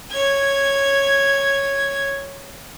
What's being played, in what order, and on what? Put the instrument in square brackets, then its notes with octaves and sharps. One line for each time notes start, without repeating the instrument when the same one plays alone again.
[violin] C#5 G#6